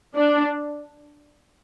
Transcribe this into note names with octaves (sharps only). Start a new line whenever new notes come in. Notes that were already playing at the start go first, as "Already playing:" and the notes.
D4